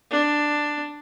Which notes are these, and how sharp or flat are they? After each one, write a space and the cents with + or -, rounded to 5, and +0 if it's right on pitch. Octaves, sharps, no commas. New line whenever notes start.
D4 +10